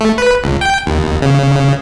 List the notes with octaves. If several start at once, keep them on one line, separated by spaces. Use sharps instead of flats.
A3
B4
C#2
G5
D#2
C#3